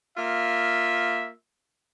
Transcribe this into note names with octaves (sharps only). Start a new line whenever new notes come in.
A#3 F4 E5